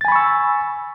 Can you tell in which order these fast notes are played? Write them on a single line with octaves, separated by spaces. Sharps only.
A6 G#5 B5 C#6 E6